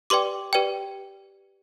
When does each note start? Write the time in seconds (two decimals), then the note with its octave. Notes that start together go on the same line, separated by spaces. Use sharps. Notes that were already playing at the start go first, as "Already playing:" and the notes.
0.10 G4 B4 D5 G5 C6 D6
0.53 G4 B4 D5 G5